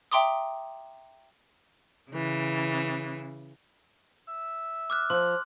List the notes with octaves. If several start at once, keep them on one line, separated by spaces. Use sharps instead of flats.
E5 G5 A#5 C6 D6 D#6
C#3 E3
E5
D6 F6 F#6
F3 F4 C6 F#6